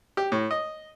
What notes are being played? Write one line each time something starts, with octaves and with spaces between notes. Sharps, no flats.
G4
A2
D#5